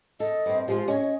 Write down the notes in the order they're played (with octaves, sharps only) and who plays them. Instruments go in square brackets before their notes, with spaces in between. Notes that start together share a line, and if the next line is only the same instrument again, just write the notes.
[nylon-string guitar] A4 [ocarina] D#5
[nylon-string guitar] G2 C4
[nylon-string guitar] F3 G#3 F4 [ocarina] G4
[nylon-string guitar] C#4 C#5 [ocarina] D#5